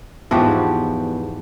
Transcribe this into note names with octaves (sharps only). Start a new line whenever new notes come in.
E2 G#2 F3 E4 F#4 G4